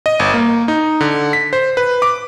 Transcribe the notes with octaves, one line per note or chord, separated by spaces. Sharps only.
D#5
G1
A#3
D#4
D3
B6
C5
B4
D6